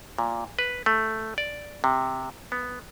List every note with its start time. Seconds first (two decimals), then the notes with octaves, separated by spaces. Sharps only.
0.18 A#2
0.59 B4
0.86 A3
1.38 D5
1.84 C3
2.52 B3